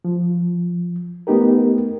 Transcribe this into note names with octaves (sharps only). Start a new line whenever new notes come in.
F3
A3 B3 D#4 G4 A#4